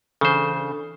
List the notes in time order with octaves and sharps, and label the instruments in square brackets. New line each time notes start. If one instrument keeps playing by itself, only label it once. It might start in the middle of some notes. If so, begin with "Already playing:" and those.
[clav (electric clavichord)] C#3 C5 [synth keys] E3 D4 A4